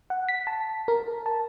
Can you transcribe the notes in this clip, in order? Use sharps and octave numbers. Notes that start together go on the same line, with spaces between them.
F#5
B6
A5
A#4
A5